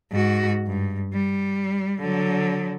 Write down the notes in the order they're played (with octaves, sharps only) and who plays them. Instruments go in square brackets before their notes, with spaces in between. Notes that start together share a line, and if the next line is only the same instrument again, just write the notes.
[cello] G#2 F#4
G2
G3
D3 F#3